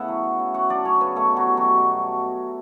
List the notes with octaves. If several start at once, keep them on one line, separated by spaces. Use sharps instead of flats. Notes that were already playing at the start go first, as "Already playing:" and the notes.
Already playing: C#3 A3 B3 E4 A4 B4 E5 F#5
F#3
F#3
C#3
C#3 F#4 F#5
F#3 D4 D5
F#3 C#4 C#5
C#3 B3 B4
B2 A3 A4
F#3 G3 F#4
G3
B2 F#3 F#4
B2
G3